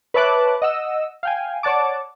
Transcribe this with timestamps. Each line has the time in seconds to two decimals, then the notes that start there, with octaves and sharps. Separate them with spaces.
0.14 B4 C#5 E5 A5 D6 F#6
0.62 D#5 F#5 E6
1.23 F5 G5 G#5
1.63 C#5 D5 F#5 A5 D6